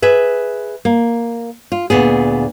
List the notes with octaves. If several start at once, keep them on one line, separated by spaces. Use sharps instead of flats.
G#4 B4 E5
A#3
F4
D2 A#2 B3 G#4